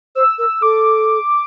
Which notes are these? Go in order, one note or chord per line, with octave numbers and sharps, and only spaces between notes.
C5 E6
A#4 E6
A4 D6